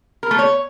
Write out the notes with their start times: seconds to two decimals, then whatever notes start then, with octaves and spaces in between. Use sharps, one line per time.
0.23 A#4
0.31 A3
0.39 C#5